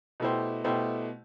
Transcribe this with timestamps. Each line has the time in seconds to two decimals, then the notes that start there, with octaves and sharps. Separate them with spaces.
0.20 B2 A3 E4 G4 C5
0.64 B2 A3 E4 G4 C5